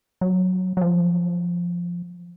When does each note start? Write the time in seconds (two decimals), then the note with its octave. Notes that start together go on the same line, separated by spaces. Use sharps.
0.21 F#3
0.77 F#3
0.81 F3